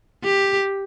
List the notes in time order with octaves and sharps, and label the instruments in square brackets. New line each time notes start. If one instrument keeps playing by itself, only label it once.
[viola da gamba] G4